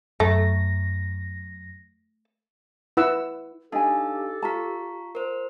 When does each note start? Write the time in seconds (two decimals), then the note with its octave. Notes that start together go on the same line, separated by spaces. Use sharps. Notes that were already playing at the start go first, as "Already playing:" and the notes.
0.20 F#2 A3 A#6
2.97 E4 B4 F#5 E6
3.72 D4 D#4 G4 A4 F5 G#5 A5
4.43 F4 A5 A#5 C#6 B6
5.15 A#4 C5